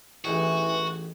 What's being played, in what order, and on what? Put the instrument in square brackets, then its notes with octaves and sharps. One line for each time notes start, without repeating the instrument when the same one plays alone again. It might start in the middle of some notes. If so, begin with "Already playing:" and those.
[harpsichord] A1 D#4 G#4 [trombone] E3 [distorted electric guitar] F#4